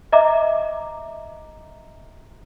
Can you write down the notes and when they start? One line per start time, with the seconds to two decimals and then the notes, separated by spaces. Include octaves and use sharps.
0.12 D#5 E5 A#5 D6